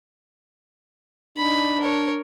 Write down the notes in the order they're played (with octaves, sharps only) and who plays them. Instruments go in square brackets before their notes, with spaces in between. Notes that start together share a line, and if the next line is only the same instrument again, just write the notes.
[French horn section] D4 [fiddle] D#4 B5
[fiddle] A#4 C#5